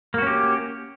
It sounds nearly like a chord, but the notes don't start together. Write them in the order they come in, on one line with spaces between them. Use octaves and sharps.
A#3 F#4 C#4 G4